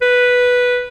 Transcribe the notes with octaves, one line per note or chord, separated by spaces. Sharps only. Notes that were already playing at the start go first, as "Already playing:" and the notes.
B4